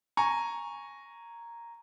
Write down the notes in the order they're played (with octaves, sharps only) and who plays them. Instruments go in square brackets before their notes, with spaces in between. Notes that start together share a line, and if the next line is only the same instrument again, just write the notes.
[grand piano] G#5 A#5 C#6